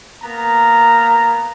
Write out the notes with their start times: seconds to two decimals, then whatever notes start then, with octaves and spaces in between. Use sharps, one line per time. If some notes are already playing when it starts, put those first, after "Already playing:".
0.23 A#3 B3 A#5